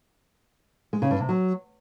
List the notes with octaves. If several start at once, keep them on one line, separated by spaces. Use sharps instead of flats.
G#3
C#3
G2
C3
F#3